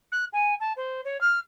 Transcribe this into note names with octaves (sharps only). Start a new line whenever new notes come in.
F#6
G#5
A5
C5
C#5
F6